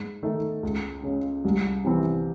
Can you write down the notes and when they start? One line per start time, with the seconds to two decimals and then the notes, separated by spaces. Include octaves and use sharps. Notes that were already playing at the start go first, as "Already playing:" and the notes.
Already playing: G#2
0.23 D#3 A3 D#4
0.63 C#2
1.03 C#3 G#3
1.45 C2
1.84 C3 E3 C4